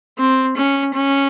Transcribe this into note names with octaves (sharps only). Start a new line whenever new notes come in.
C4
C#4
C#4